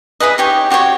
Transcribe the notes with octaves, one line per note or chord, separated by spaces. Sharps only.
E4 G#4 B4 D#5
D#4 G4 C#5
F#4 G4 C5 C#5